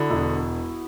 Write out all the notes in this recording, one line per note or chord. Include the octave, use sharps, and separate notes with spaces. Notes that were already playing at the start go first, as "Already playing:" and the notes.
Already playing: D3 B3 E4 F#4
E1